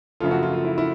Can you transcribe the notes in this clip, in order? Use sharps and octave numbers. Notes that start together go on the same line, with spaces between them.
F#2 C#3 F3 A3 F4
F#4
F4
F4
E4
E4